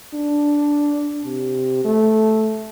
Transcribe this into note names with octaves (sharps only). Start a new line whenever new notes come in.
D4
C3
A3